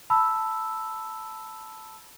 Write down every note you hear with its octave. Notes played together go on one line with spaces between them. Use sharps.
A5 B5 E6